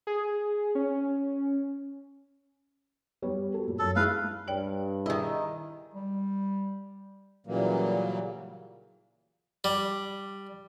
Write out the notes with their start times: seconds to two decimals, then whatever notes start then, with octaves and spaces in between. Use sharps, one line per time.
0.07 G#4
0.75 C#4
3.22 G3 B3 C#5
3.54 F#4 A4
3.67 A#2
3.79 F#2 A4
3.96 G#3 E4 G#4 B4 F5
4.48 G2 C#5 D5 G5 F#7
5.06 D#3 E4 G#4 D5 D#5 E6
5.94 G3
7.47 A#2 C#3 E3 F#3 G3 A#3
9.64 G3